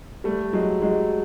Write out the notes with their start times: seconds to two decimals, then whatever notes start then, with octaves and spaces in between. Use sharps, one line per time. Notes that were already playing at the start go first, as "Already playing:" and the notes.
0.24 G3 A3
0.53 F#3 G#3
0.82 F#3 G#3